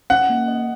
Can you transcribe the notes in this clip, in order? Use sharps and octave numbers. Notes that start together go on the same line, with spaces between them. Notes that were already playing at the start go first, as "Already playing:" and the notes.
C#4 F#5
A#3
D#5